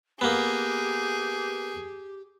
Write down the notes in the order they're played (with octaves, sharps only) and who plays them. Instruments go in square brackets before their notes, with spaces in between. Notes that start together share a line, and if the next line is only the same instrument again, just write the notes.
[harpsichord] A#3 B3 [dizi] G4 [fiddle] G#4